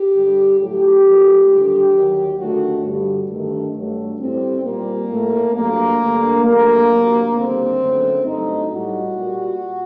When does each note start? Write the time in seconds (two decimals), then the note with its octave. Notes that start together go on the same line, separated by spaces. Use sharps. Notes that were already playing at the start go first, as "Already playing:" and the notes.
Already playing: G4
0.13 G2 D3 G3
0.58 A2 F#3 A3 G4
1.04 A#2 F#3 A3
1.49 D#2 D3 G3
1.93 D#2 D#3 F#3
2.38 D#2 D3 A3 F#4
2.84 G2 D3 G3
3.29 G2 D#3 A3
3.74 G2 F#3 A3
4.19 A2 G3 C4
4.64 A#2 G3 A#3
5.09 A2 A3
5.54 G2 F#3 A3 A#3
6.00 G2 D3 A3
6.45 G2 F#3 A3 A#3
6.90 D2 C3 F#3
7.35 D#2 D3 G3 C4
7.80 F#2 D3 F#3 A3
8.25 G2 F#3 A3 D#4
8.70 A2 G3 F#4
9.16 A#2 G3